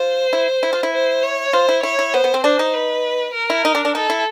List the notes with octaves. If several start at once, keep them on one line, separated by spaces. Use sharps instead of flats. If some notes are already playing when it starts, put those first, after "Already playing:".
Already playing: F4 C5
E4
E4
F4
E4
C5
C#5
F4 C5
E4
E4 C#5
E4
B3 C5
B3
C4
D4 C5
D#4
B4
A#4
E4
D#4
D4
D4
D#4 A4
E4